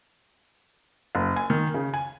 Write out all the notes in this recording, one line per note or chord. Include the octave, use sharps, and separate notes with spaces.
F#1
G#5
D#3
C#3
G#5